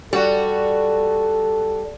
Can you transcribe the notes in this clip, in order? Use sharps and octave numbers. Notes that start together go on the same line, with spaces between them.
G3 F#4 A4 D5